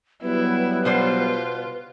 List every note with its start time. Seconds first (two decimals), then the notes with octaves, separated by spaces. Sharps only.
0.23 F#3 G3 B3 E4 B4
0.85 B2 F4 C5 D5